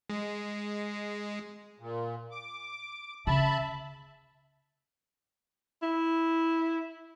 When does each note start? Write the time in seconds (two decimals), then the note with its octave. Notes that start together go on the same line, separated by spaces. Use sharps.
0.10 G#3
1.80 A#2
2.31 D6
3.27 C#3 E5 A5 B5
5.82 E4